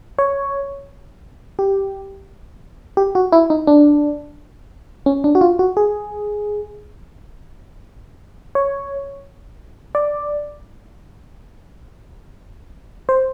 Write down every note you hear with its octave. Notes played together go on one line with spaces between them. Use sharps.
C#5
G4
G4
F#4
E4
D#4
D4
C#4
D4
F#4
F4
F#4
G#4
C#5
D5
C5